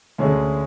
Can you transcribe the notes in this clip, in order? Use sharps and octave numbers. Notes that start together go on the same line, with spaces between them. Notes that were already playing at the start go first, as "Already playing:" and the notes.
D2 D3 G#3 C#4 G#4